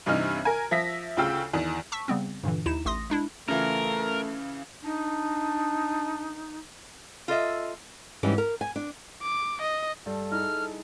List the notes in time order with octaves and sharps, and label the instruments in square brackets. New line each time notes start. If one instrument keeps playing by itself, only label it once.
[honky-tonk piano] G2 C3 E3 D#4 F6
A#4 G#5
F3 E5 A#6 B6
D2 C#3 F4 G5 E6
E2 D#3
[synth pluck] A5 C#6 E6 B6
C#3 G3 B3 C4
G2 A#2 D3 E3
D#2 D#4 E4 E7
A1 A3 C6 D#6 A#6
G#3 D4 E4
[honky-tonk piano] C#3 E3 F4 [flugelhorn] A3 [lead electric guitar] A#4
[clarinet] D4 [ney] D#4
[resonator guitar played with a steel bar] F4 A4 D#5 E5
[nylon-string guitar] G#2 E3 G3 C#4
A#4
G#5
D4
[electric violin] D6
D#5
[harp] G2 [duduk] A4
[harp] D#4 E4 G#4 [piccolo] F6